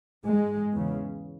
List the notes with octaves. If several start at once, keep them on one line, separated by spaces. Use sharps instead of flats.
G#2 G#3
E2 C#3